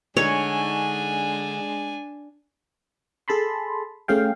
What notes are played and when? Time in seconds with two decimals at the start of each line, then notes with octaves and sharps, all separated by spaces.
0.17 D3 G#3 D4 D#4 C#5 G#5
3.28 G#4 A4 A5 B5 C6
4.08 A3 C#4 G#4 F5 G5